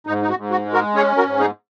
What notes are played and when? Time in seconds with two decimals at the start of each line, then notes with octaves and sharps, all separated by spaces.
0.07 G#2 D#4
0.22 D#4
0.29 F#4
0.37 G#2
0.51 F#4
0.65 G#3
0.73 F#4 A#4
0.95 C#4 G#4 C#5
1.17 F#4 A#4
1.25 G#2
1.39 D#4 G#4